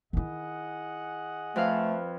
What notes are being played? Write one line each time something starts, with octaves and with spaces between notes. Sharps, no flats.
D#3 E4 G#4 D#5 F#5
F2 A3 B4 F5